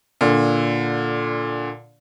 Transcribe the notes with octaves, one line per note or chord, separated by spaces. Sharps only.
A#2 D3